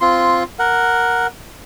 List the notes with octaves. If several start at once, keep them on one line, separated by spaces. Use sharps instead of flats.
C4 F4 C6
A#4 F#5